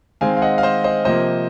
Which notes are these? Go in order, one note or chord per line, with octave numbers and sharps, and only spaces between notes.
D#3 G#3 C4 F5 G#5
F5
D#5 F#5
F5
C5 D#5
C5 D#5
C3 F3 A#3 C5 D#5